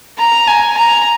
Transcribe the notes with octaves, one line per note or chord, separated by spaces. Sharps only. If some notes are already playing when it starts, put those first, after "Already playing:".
A#5
G#5
A#5